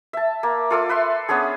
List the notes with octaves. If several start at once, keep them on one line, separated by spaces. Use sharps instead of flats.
E5 A5
A#3
F4 A4 D5
B4 E5 C6
B3 C#4 D4 G#4